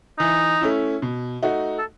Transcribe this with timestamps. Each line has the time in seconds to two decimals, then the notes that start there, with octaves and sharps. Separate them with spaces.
0.19 E3 D#4
0.61 A3 C#4 E4
1.02 B2
1.43 A3 D#4 F#4
1.78 A4